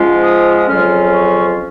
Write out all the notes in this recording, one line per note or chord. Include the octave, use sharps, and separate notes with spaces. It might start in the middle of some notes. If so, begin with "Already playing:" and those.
Already playing: G#2 F3 G#3 C#4 F4
D#6
D#6
F2 C#3 F#3 C#4 F4 F6
C#6